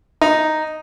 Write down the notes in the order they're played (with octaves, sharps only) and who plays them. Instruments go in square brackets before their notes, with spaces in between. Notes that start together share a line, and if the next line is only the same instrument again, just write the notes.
[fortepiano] D#4